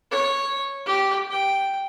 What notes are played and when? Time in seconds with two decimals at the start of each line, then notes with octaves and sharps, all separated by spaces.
0.11 C#5
0.86 G4
1.31 G5